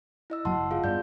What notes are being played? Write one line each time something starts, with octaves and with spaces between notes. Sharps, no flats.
E4 D#5 E6
F#1 F#3 A#3 F#5 A5 C6
F#1
F4 G#4 F5
G2 B3 D5 G6